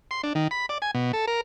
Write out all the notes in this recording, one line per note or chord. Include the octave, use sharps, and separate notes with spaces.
C6
D4
D#3
B5
D5
G#5
B2
A4
A#4